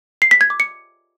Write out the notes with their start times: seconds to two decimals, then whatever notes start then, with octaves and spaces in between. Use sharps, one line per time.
0.22 C7
0.31 B6
0.41 G#6
0.50 D6
0.60 C#7